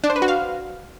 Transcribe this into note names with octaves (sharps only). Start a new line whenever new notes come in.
D4
C5
B4
F#4
F5